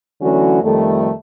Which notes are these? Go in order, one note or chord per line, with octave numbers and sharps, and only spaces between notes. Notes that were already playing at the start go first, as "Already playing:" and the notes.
D3 E3 F#3 A3 C#4 F#4
F2 D#3 G3 A3